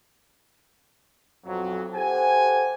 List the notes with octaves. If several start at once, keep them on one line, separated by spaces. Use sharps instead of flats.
B1 F2 F#3
G4 A4 C5 F#5 G#5